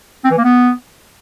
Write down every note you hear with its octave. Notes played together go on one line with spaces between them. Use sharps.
C4
E3
A#3
B3